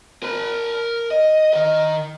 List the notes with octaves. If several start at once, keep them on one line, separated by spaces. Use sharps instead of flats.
A#4 B5
D#5
D#3 D#5